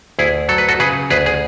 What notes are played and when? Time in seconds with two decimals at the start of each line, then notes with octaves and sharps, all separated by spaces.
0.19 D2 E4 G#4
0.49 F#3 A4
0.58 B4
0.69 F#4 A4
0.80 C#3 G#4 B4
1.10 D2 G#4 B4
1.26 G#4